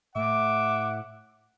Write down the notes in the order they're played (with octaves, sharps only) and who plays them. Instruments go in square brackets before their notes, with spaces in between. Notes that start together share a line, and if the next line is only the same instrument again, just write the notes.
[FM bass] A2 [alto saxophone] E5 [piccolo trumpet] F#5 [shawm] D6